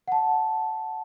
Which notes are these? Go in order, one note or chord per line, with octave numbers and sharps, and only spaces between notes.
F#5
A5